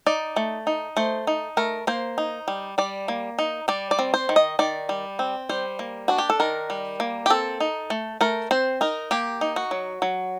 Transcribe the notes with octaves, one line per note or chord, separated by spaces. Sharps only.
D#4 D5
A3
D#4
A3 C5
D#4
A3 A#4
A#3 C5
D#4
G3
G3 D5
A#3
D#4
G3 D5
D5
C4
C5
D#3
D#5
D#3 D5
G3
C4
G3 C5
A#3
D4 F#4
G4
A4
D#3 A#4
G3
A#3
G4
C4 A4
D#4
A3
A3 A#4
C4 C5
D#4 A#4
A#3 G4
D#4
F#4
F#3
F#3